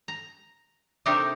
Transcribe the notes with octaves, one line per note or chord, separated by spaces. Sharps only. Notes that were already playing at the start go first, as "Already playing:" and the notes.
A#5
C3 A3 D4 D#4 G4 A#4